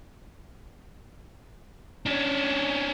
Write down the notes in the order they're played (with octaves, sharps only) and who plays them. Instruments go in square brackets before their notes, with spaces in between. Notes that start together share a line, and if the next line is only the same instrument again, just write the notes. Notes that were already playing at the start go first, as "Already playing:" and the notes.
[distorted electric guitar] C#4 D4